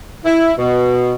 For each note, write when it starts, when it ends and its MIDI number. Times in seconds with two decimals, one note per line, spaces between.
0.25 0.52 64
0.58 1.14 47